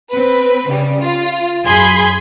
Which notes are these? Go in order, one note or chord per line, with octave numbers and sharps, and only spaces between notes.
C4 B4
C#3 G3
F4
F#2 G#4 B5 C6 G#6